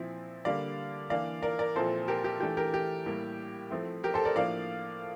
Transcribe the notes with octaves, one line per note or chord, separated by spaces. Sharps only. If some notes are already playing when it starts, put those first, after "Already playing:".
Already playing: A#2 F3 C4 E4
D3 G3 A#3 D4 D5 F5
E3 A#3 D4 D5 F5
A#4 D5
A#4 D5
A#2 F3 C4 E4 A4 C5
G4 A#4
G4
E3 A3 D4 G4
G4 A#4
G4
A2 G3 A#3
F3 A3 C4 E4
G4 A#4
A4 C5
A#4 D5
A2 F3 A#3 D4 D5 F5